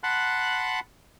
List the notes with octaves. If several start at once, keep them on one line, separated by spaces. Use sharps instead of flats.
F#5 A5 B5 C6 F#6